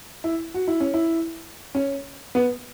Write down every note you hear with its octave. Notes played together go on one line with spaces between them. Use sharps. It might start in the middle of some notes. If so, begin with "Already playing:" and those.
E4
F#4
E4
C#4
E4
C#4
B3